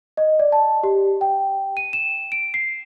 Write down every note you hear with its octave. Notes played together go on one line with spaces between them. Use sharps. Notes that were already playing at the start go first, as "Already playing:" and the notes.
D#5
D5
A5
G4
G5
D#7
E7
D7
C7